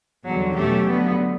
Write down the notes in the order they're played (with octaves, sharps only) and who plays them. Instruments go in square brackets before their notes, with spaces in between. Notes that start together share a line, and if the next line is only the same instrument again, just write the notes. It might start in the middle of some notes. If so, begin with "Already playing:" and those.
[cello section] E2 D3 G3 [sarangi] F#3
[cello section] B2 F#3 C#4 G4 [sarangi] A3
[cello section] D3 F#3 A3 [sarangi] B3